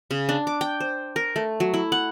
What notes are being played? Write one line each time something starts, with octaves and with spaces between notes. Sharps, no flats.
C#3
D4
D6
G5
C5
A#4
A3
F#3
E4
F#5